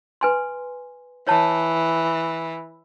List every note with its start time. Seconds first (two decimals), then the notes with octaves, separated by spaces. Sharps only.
0.21 B4 G#5 C6
1.27 E3 C#5 A5